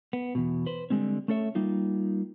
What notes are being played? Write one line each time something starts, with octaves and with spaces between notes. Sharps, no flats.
B3
E2 B2
B4 C5
D3 G3 G#3 C4 C#4
A3 C#4 A4 C#5 E5
G3 A#3 D#4 F4